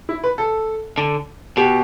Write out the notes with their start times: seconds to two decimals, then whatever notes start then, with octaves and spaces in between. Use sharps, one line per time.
0.09 E4
0.24 B4
0.38 A4
0.98 D3
1.57 B2 G4